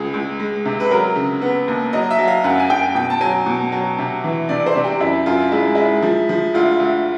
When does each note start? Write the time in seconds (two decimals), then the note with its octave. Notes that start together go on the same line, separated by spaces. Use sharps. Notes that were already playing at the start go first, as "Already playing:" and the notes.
Already playing: C#2 G#4
0.14 C#2
0.40 G#3
0.65 C3
0.80 B4
0.91 F#3 A#4
1.16 C#3
1.42 B3
1.68 D#2
1.93 F#3 D#5
2.11 E5
2.19 F#3
2.28 F5
2.44 F#2 F#5
2.60 G#5
2.70 F#2 G5
2.95 B2 G5
3.10 A5
3.21 F#3 G#5
3.46 B2
3.72 F#3
3.98 C3
4.24 E3
4.49 C3 D5
4.66 C5
4.75 C3
4.84 G4
5.00 F#2 E4
5.26 F#2 F4
5.52 G#3 E4
5.75 G#3 E4
6.02 F3
6.29 F3
6.54 D2 F4
6.80 D2